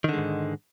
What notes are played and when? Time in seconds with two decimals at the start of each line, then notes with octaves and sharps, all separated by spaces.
0.04 D#3
0.09 D3
0.13 G#3
0.18 G#2